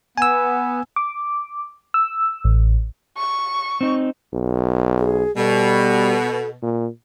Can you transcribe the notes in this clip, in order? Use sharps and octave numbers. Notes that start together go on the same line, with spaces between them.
B3 G#5 E6
D6
E6
A1
C#6
C4 D#4
B1
G#4
B2 G3 A4
A#2